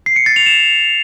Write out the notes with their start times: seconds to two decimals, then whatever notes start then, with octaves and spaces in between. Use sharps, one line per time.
0.06 C7
0.16 C#7
0.26 A6
0.36 F7
0.46 E7